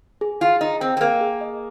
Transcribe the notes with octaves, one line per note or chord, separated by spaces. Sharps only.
G#4
F4 G#4
D#4 D#5
C4 G5
C4
A#3 G#4
G#4
D#5